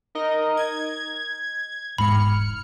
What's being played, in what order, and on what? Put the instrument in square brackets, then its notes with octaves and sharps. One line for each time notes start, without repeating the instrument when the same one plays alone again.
[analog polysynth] D#4 A#4 D#5
G#6
[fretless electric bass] E1 G#2 G#3 [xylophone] B5 [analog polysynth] F6 C#7